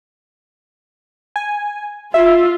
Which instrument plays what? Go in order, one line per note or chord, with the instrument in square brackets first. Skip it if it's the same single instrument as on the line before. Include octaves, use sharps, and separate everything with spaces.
[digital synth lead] G#5
[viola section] F4 [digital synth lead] E5